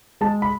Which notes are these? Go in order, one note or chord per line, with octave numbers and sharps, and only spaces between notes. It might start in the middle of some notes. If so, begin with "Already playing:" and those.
G#3 A5
B5